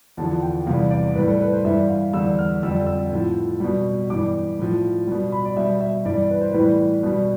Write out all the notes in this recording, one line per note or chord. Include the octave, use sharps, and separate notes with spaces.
E2 D3 F3 A5
G5
E2 C3 E3 G3 F5
D5
A2 G3 B4
A4
B4
C5
G2 E3 G3 E5
F5
E2 D3 G3 E6
F6
F2 D3 G3 E6
E6
A2 F3
B2 G3
G2 E3 G3 D6
A2 F3
B2 G3
B5
D5
B2 G3 E5
E5
G2 E3 G3 D5
B4
C5
A2 E3 G3 B4
B2 G3